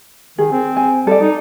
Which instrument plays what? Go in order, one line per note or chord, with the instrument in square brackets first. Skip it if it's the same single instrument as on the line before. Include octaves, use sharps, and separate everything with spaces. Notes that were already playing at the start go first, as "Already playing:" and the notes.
[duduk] D#3 [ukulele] G#4
[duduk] C4
[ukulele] G#5
[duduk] G3 [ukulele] A4 D5
[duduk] D#4